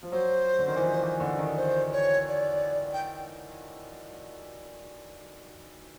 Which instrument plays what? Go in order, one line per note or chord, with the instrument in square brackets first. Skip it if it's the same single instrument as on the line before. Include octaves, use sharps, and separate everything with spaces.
[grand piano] F3
[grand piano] F#3 [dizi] C5
[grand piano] D3
D#3
E3
F3
E3
D3
D#3
[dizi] C5
C#5
D5
G5